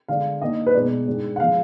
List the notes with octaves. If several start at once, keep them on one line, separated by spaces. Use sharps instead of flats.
D3 G#3 D4 F5
D#3 A#3 D4 D#5
B4
B2 G#3 D#4 D5
G#2 D#3 G#3 D4
F#5
F3 G#3 D4 F5